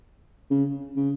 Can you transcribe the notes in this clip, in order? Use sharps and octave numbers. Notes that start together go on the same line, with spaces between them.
C#3
C#3